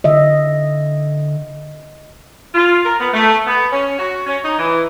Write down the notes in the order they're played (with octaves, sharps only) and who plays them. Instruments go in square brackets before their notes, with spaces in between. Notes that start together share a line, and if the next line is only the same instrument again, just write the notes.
[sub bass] D3 [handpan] D#5 E5
[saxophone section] F4
A#4
B3
A3
B3
C#4
F#4
C#4
D#4
E3